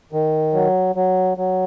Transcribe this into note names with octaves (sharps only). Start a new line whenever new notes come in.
D#3
F#3
F#3
F#3